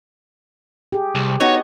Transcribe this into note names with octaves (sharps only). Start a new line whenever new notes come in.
G4 G#4
C2
B3 D#4 F#4 C#5